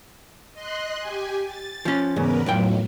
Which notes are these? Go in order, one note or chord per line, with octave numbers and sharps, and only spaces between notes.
D#5 C6 F#6
G4 G#5
A6
F3 C#4
E2 G#2 C#3 B3 A#4 B4
B1 F2 A2 F#3 G5